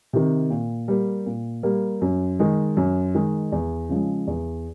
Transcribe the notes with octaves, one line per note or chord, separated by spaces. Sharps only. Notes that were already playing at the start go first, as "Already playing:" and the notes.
C3 D#3
A#2
G3 A#3
A#2
G3 A#3
F#2
D#3 G#3
F#2
D#3 G#3
E2
C#3 F3 G#3
E2